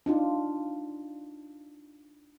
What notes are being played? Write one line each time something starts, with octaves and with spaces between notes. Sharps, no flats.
D4 D#4 F4